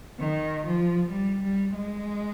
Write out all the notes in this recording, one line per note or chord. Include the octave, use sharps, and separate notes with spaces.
D#3
F3
G3
G3
G#3